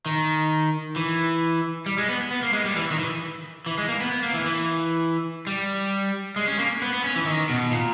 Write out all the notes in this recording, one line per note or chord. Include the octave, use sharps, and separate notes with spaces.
D#3
E3
G3
G#3
B3
B3
A#3
G#3
G3
E3
D#3
E3
E3
G#3
A#3
B3
B3
A#3
E3
E3
G3
G#3
C#4
A#3
B3
B3
C#4
E3
D#3
B2
A#2